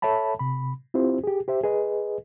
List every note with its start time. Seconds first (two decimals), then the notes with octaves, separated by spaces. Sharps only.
0.02 A4 C#5 E5 A5 B5
0.39 C3 B5
0.94 C4 E4 F4 G4 C5
1.24 G4 G#4
1.48 G4 C5 E5
1.64 G#4 B4 D#5